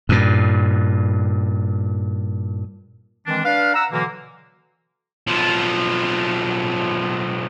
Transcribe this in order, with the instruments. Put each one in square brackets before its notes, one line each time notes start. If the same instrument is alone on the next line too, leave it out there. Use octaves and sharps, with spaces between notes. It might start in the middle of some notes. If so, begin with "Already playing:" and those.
[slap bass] G2 A#2
[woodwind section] D#3 E3 G#3 C4 D4
D4 B4 D5 F5
F#5 A#5 E6
B2 D3 E3 F#3 A#3
[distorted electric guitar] B1 F3